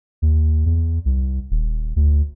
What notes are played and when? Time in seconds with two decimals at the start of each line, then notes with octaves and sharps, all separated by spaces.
0.22 D#2
0.66 E2
1.05 C2
1.51 D#1
1.96 D2